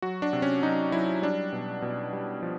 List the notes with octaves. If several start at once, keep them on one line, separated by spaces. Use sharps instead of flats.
F#3 F#4
D4
C3
C#4
F#3 D#4
F#3 E4
G3 D4
B2
B2
G3
F3